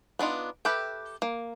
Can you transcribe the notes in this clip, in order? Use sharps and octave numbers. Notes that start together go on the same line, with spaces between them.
B3 D4 D#4 F4
G4 A4 B4 E5 G5
A#3